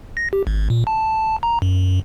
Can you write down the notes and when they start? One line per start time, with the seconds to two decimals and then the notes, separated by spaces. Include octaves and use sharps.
0.17 A#6
0.33 G4
0.47 G#1
0.70 A#2
0.87 A5
1.43 A#5
1.62 F#2